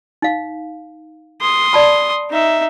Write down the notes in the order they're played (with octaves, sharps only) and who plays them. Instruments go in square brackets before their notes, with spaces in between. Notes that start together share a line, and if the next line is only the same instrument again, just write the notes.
[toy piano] D#4 F5
[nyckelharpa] C6 D#6
[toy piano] D5 A5 B5
[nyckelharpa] D#4 E5